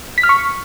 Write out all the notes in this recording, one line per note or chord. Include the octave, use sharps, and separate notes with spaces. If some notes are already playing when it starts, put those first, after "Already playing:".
B6
F6
C#6